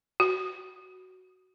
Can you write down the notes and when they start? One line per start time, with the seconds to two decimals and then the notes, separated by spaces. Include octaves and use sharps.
0.20 F#4